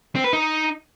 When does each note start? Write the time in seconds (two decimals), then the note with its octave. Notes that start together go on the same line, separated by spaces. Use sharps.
0.15 C4
0.24 B4
0.33 D#4